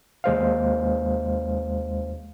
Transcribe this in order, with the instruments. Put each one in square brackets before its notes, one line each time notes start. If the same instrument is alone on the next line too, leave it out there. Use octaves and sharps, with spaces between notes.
[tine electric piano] D#2 G#3 C5 F5